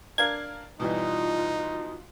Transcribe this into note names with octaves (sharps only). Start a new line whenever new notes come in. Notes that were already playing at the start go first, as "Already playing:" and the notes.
D4 A#4 F5 G#6
B2 E3 G3 D#4 F4